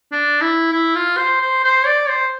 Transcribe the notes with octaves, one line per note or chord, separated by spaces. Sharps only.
D4
E4
E4
F4
C5
C5
C5
D5
C5